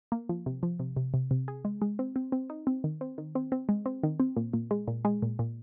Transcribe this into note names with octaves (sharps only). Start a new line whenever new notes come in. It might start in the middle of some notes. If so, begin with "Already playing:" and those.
A#3
F3
C3
F3
C3
C3
C3
C3
G#4
G#3
G#3
C4
C4
C4
D#4
C4
D#3
C4
D#3
C4
C4
G#3
C4
D#3
C4
A#2
A#2
G#3
A#2
G#3
A#2
A#2